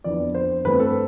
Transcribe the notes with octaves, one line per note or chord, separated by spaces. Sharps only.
F2 E3 B3 D4 D5
C5
G2 E3 A3 C4 B4
A4